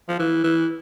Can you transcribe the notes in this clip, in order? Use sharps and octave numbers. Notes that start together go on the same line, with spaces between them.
F3
E3
E3